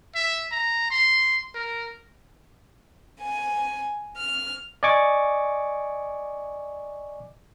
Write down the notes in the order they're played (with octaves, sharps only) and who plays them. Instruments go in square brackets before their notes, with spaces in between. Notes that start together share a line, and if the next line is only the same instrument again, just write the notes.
[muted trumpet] E5
A#5
C6
A#4
[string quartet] G#5
F6
[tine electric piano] D5 D#5 G#5 C#6 D6